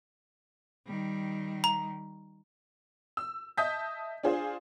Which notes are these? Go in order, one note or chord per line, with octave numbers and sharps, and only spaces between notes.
D#3 G3
A#5
E6
D#5 E5 A5 D#6 G6 B6
D4 F4 G#4 C5 F5